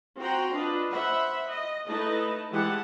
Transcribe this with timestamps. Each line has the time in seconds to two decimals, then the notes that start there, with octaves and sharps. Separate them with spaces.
0.18 C4 F#4 F#5 G5 A#5 C6
0.53 D4 F4 B4 D#5
0.90 C5 E5 F#5 B5
1.48 D#5
1.88 A3 D#4 E4 B4 D#5 A5
2.52 E3 G#3 G4 F#5 A5